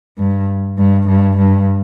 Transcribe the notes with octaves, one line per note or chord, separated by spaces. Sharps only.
G2
G2
G2
G2